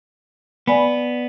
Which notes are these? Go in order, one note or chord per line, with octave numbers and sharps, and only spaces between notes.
B3 D5 G#5 B5